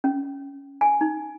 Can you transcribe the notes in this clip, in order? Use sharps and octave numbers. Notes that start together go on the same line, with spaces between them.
C#4
G#5
D#4